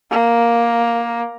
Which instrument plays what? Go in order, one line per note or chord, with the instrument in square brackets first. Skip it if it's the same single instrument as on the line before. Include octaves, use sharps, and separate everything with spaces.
[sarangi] A#3